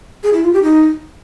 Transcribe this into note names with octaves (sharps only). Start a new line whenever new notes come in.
G#4
E4
F4
G4
D#4